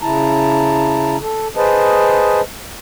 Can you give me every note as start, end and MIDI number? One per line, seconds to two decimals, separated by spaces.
0.02 1.16 49
0.02 1.16 64
0.02 1.16 81
0.02 1.16 82
1.21 1.48 69
1.56 2.41 68
1.56 2.41 71
1.56 2.41 72
1.56 2.41 75
1.56 2.41 81